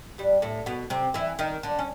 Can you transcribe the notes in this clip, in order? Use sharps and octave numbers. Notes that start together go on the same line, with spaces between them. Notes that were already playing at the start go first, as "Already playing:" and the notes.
G2 G3
A2 A3
B2 B3
C3 C4
E3 E4
D#3 D#4
D3 D4
C#4